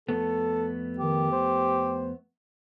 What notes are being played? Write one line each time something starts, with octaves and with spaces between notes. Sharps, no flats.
F2 A3 B3 A4
D#3 G4
C5